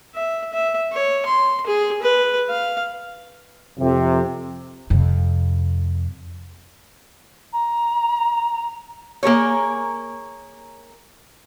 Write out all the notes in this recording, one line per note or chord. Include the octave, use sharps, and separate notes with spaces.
E5
E5
C#5
C6
G#4
B4
F5
F2 C3
F2 C3
A#5
A#3 G#4 A#4 C#5